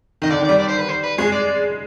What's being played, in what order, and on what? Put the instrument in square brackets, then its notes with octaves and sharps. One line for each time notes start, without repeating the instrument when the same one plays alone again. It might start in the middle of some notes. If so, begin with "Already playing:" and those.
[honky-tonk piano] D#3 [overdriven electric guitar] D#5
[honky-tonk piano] D3 [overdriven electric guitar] D5
[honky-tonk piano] D#3
[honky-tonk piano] G3 [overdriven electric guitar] D5
[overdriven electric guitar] D5
C5
B4
C5
B4
[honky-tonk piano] G#3 [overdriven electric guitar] G#4
[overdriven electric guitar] D5